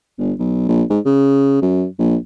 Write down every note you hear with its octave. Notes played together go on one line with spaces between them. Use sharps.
G1
B1
A#1
G#2
C#3
F#2
A#1